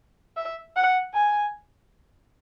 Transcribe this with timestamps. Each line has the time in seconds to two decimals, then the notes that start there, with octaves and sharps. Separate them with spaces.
0.37 E5
0.76 F#5
1.14 G#5